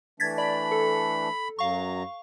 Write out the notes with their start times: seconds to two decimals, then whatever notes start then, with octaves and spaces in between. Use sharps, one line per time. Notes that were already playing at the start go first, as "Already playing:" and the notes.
0.20 E3 A3 D4 G#6 A6 B6
0.38 D5 B5
0.71 A4
1.59 F#2 F#3 F5 A#5 C#6